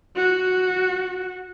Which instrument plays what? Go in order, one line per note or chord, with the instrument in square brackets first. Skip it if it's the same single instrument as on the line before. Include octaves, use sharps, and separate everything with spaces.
[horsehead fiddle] F#4